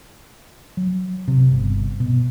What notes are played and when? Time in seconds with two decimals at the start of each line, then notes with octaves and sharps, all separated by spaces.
0.77 F#3
1.28 C3
1.51 G1
2.00 B2